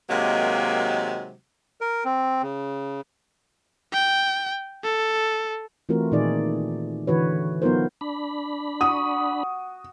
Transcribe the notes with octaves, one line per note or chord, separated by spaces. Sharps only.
C3 D#3 F#3 G#3 A#3
A#4
C4
C#3
G5
A4
E3 A3 C4 F4 F#4 A#4
A#2 D#3 D#4 G#4 D5
D3 E3 F#4 B4 C#5
F#3 B3 D#4 F4 A#4 C5
D4 B5
F#4 D#6